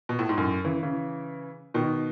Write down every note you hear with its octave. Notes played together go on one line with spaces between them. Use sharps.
B2
A2
G#2
F#2 A2
C#3 E3
C#3 E3
B2 D#3